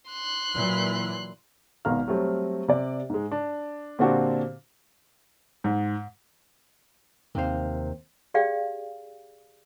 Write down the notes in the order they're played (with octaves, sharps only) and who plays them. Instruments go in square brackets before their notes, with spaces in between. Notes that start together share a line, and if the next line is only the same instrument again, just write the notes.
[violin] C6 F#6
[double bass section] A#2 E3 F#3
[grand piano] G#1 B2 F5 A#5 F6
F#3 G3 A3 C4
C3 D5
G#2 G#3
D4
A#2 D3 C4 D4 F#4 G4
[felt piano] G#2
[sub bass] D#2 [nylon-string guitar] C3 F5 [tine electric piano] D#3 A#3 C5
[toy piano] G4 G#4 D5 F5 G5